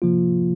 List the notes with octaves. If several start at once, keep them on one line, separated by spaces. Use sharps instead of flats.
C3 F3 A#3 F4